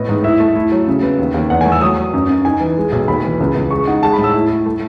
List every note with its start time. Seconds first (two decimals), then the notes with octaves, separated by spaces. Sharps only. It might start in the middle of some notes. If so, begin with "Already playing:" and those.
Already playing: A2 B3 D#5
0.09 G#2
0.24 E4 E5
0.40 A3
0.55 E4
0.72 F#3
0.88 C#3
1.03 B3
1.19 D#2
1.34 D#2
1.50 E2 F#5
1.61 G#5
1.66 A3
1.72 E6
1.81 F#3 D#6
1.98 F#3
2.14 F#2
2.30 F#2
2.45 D#4 G#5
2.61 E3
2.77 G#3
2.92 B1
3.08 D#2 B5
3.24 E3
3.40 C#2
3.55 C#2
3.71 G#3 C#6
3.87 D#4 F#5
4.02 G#3 A5
4.13 B5
4.18 A2
4.24 E6
4.34 E4
4.50 E4
4.66 A3